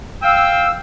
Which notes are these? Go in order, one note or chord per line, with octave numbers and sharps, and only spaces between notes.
F5 G5 E6